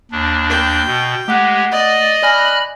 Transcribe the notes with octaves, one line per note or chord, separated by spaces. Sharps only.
D#2 D4
G5
B2
G#3 A3 G4 F#5 F#6
D5 D#5
D5 G#5 B5 F6 F#6 A#6